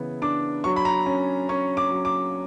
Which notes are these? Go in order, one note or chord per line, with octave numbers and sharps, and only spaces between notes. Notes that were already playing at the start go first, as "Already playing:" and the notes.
Already playing: C#3 E3 B3
D4 D6
F#3 C#6
B5
A#5
C#4
C#4 C#6
D6
F#3
D6